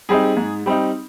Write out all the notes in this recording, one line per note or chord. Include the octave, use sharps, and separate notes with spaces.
G3 C4 D#4 G#4
G#2
G3 C4 D#4